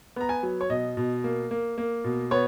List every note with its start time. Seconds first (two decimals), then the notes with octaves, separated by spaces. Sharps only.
0.16 B3 A#5
0.29 G#5
0.43 F#3
0.61 C#5
0.70 B2 D#5
0.97 B2
1.24 A#3
1.51 A#3
1.78 A#3
2.04 B2
2.31 B3 C#5